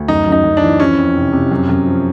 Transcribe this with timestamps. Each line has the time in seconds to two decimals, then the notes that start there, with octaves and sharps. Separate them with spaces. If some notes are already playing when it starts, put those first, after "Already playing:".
Already playing: D2
0.08 F#2 D#4
0.27 F#2
0.32 D#4
0.44 F#2
0.57 D4
0.63 E3
0.80 F3 C#4
0.98 F2
1.16 C3
1.33 C3
1.52 F#2
1.69 F#2
1.87 F3